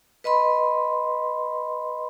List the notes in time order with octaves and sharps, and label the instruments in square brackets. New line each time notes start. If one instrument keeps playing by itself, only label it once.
[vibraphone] B4 D#5 B5 C6